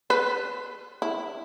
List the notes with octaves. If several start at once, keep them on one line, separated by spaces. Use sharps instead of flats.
B4
E4